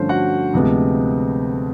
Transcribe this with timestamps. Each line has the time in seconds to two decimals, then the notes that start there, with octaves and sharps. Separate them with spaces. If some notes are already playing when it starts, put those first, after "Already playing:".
Already playing: G2 D3 F3 A3 C#4 C5
0.09 F#4 F#5
0.53 D2 C3 F3 G#3 B3